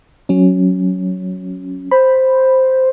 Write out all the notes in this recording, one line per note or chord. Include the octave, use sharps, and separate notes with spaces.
F#3 C#4
C5 B5